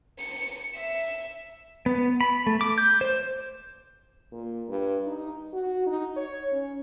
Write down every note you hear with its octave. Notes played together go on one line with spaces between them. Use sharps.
C#7
E5
B3
B5
A3
D6
G6
C5
A#2
G2
D#4
F#4
D#4
C#5
C#4